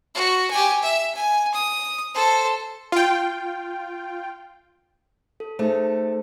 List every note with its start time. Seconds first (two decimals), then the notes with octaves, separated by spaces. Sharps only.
0.15 F#4
0.51 G4 G#5
0.83 E5
1.15 G#5
1.54 D#6
2.15 A4 C5
2.92 F4 G5
5.40 A4
5.59 A3 D#4 G#4 C5